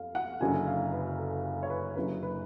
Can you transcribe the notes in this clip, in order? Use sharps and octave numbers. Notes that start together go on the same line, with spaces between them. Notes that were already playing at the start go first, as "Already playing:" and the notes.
Already playing: F2 A4 F5
F#5
F#1 F#2 D3 G#5
F5
B4
A4
A4
C#5
B4
F#1 F#2 D3 B4
B4